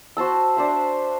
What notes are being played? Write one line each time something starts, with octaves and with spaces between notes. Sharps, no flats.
F#4 C5 A5 E6
D4 C5 E5